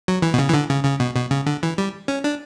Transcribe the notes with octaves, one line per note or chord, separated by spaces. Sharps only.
F#3
E3
B2
C#3
E3
D3
C#3
C#3
B2
B2
C#3
D3
E3
G3
C#4
D4